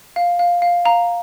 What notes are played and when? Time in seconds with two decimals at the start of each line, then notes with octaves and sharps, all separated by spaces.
0.16 F5
0.39 F5
0.62 F5
0.85 F5 A#5